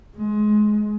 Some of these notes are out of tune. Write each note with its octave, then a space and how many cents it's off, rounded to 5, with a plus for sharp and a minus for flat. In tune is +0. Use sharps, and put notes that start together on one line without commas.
G#3 +25